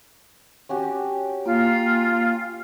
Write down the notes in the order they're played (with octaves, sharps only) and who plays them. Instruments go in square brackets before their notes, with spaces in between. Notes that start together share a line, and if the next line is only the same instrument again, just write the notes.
[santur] C#4 F#4 G4
[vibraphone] A#3 [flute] F4